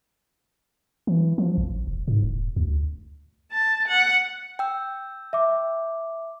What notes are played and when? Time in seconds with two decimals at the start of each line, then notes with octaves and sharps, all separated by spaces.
1.07 E3
1.38 F3
1.58 A1
1.87 E1
2.08 G#2
2.23 D#1
2.56 D2
3.52 A5
3.88 F#5
4.59 G5 E6
5.33 E5 D6